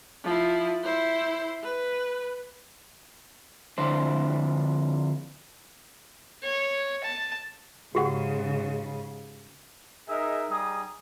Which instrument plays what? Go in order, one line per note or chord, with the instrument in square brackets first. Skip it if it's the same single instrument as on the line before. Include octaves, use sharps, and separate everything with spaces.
[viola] F3 E4
E4 C5
B4
[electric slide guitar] F2 D3 D4 E4 C5
[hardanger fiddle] C#5
A5
[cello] G#2 C#3 [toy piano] F#4 G4 F#5
[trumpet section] D#4 G#4 A#4 D#5 E5
G3 D#4 G#4 A#5 D#6